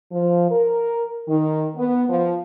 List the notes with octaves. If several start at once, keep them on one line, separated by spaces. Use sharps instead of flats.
F3
A#4
D#3
B3
F3